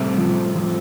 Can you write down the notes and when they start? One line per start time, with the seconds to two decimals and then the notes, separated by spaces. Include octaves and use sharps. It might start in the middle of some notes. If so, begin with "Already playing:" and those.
Already playing: A2 C3 G3 C4 A4
0.18 F3
0.55 F3